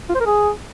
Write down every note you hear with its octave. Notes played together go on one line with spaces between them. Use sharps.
F4
C5
A#4
G#4